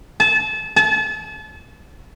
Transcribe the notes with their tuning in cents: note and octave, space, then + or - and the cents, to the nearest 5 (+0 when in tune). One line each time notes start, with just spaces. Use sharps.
A5 -30
A5 -35